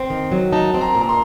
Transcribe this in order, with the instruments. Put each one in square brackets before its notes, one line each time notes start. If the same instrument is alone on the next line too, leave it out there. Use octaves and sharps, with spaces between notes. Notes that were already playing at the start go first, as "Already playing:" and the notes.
Already playing: [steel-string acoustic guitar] C4
D#3
F#3
[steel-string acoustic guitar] D#4 [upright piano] A5
[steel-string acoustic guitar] C4
[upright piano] A#5
[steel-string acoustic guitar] A#2
[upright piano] A#5
C6